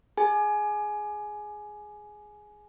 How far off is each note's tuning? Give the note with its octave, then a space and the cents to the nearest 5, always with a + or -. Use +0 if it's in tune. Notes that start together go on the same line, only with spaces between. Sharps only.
G#4 +0 G#5 +15